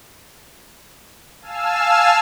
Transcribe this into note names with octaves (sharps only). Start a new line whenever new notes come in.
F5 G#5 A5 E6 F6